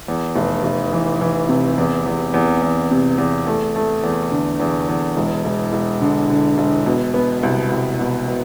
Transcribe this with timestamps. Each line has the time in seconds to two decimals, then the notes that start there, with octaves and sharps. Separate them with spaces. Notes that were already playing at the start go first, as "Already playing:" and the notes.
0.08 E2
0.36 F1
0.64 F1
0.93 E3
1.21 E3
1.49 C3
1.78 E2
2.06 E2
2.34 E2
2.62 E2
2.91 C3
3.18 E2
3.46 A3
3.76 A3
4.04 E2
4.31 D3
4.60 E2
4.88 E2
5.17 E1
5.45 E1
5.73 E1
6.01 D3
6.30 D3
6.58 E1
6.86 B2
7.14 B3
7.43 C2
7.71 C2
8.00 B2
8.28 B2